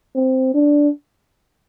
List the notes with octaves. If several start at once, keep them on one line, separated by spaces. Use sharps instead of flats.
C4
D4